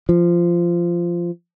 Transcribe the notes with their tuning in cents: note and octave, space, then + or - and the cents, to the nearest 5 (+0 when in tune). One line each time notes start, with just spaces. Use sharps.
F3 -15